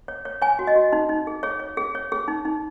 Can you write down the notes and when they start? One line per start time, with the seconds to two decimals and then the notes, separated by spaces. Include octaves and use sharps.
0.08 C#5
0.25 C#5
0.42 C#5 G#5
0.59 F#4
0.67 D#5
0.76 F#4
0.93 D#4
1.09 D#4
1.27 G#4
1.43 G#4 C#5
1.60 C#5
1.77 G#4
1.95 C#5
2.12 G#4
2.28 D#4
2.45 D#4